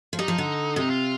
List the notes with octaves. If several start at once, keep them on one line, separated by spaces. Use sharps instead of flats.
F3
G3 D#4
F3
D3
C3 D#4
F4